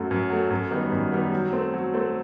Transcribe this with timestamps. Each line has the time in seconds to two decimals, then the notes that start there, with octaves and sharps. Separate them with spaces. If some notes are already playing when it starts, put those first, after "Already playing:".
Already playing: F#2 F#3 A3
0.11 F#2
0.30 F#3 A3
0.50 F#2
0.71 D#3 G3 B3
0.92 F#2
1.12 D#3 G3 B3
1.32 F#3
1.53 A3 C4
1.74 F#3
1.94 A3 C4